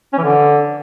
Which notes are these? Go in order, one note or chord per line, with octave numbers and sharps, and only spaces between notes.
C#4
E3
D3